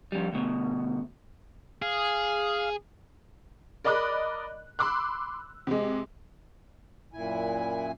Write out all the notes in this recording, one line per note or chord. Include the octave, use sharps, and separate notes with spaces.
F2 G3
D2 B2
G#4 F5
A#4 D5 D#5 B5 D6 F#6
B5 C6 D6 E6 F#6
C3 G#3
F#2 A#2 E4 G#5